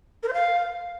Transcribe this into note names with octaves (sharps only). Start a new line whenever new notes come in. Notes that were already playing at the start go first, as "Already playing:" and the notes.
A#4
C5
F5